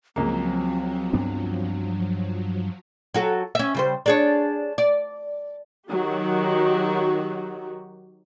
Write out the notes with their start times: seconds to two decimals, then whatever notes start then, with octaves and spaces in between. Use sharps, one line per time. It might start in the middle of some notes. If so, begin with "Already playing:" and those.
0.16 C#2 F3 F#3 A#3 C4
1.13 G2 B3 D4
3.14 F#3 F#4 A4
3.55 C#4 E5
3.74 C#3 G3 C5
4.06 D4 G#4 C#5
4.78 D5
5.89 D#3 F#3 F#4 G4